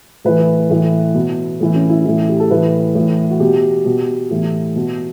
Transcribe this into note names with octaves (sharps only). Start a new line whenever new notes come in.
A2 E3 B4
A2 E3
B2
A2 E3
C#4
E4
A2 E3 E4
G4
A4
A2 E3 B4
A2 E3
F#4
B2 G4
B2
A2 E3
B2